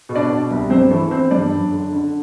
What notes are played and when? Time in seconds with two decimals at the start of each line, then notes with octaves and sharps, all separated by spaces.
0.09 B2
0.15 D4 D5
0.30 B2
0.50 C2
0.70 G2 C4 C5
0.91 E3 A3 A4
1.11 E3 C4 C5
1.31 G2 D4 D5
1.52 F#2
1.72 D3
1.93 D3